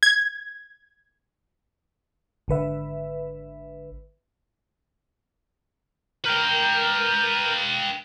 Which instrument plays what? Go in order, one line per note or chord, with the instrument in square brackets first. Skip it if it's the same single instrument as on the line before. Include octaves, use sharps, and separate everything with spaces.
[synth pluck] G#6
[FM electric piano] G#1 D3 B4 E5
[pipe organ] A#4 F6 G6 [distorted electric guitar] B4 G5